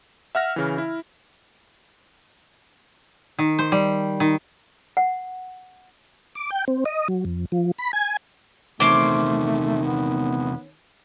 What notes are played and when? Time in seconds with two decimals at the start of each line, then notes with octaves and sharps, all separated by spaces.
0.35 E5 F#5 F6 A#6
0.56 C#3 E3
0.78 E4
3.39 D#3
3.59 C5
3.72 G3
4.20 D#3
4.97 F#5
6.35 D6
6.50 G5
6.68 C4
6.85 D#5
7.08 F#3
7.25 F2
7.52 F3
7.78 B5
7.93 G#5
8.80 E2 C3 D#3 A3 C#4 C5 D6
9.84 B3